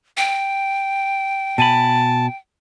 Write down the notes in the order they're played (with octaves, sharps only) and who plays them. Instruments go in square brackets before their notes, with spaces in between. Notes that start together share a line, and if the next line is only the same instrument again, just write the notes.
[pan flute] G5
[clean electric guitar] B2 G#5 B5 [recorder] A5